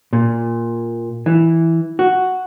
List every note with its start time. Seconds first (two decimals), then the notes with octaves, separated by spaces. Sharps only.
0.13 A#2
1.26 E3
1.99 F#4